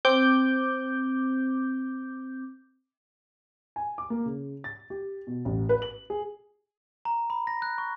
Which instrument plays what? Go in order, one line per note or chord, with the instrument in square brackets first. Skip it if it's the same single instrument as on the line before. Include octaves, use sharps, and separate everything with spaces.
[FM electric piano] C4 D6 G6
[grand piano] G#5
D6
A#3
C#3
A6
G4
B2
A1
B4
F#7
G#4
[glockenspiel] A#5
B5
A#6
F#6
C#6